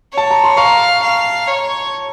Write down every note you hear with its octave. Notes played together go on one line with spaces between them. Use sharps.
C#5
A5
A#5
C6
F5 A#5 C#6
F5
C#5